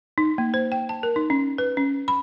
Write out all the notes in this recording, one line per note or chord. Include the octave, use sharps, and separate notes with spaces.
D#4
A#3
C5
G5
A5
A#4
D#4
C#4
B4
C#4
B5